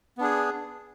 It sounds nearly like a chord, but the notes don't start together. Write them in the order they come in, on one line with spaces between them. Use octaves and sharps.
B3 D4 G#4